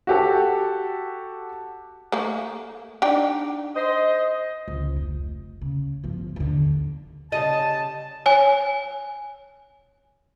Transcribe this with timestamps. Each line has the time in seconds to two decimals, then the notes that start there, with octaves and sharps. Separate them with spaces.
0.07 F#4 G4 A4
2.12 A3 A#3
3.02 D4 D#4 G5
3.76 C5 D#5
4.68 C#2
4.96 F1
5.62 C#3
6.04 G1 F3
6.36 D#2 D3
7.32 C#3 G3 D#5 A5
8.26 C#5 G#5